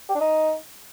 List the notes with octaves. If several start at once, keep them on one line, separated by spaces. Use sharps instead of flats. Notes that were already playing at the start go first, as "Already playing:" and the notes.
G4
D4
D#4